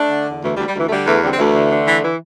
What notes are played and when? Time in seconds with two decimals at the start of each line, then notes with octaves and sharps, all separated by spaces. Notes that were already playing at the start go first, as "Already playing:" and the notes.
Already playing: A3 D4
0.10 D3
0.26 E2
0.42 D2 E3 A3
0.54 G3
0.58 D2
0.67 G3
0.74 D2 E3
0.87 A3
0.90 D3 G3
1.06 E2 E3 A3
1.22 D3 G3 C4
1.33 C4
1.38 D2 E3 A3
1.54 D3
1.70 D3
1.86 E3
2.01 E3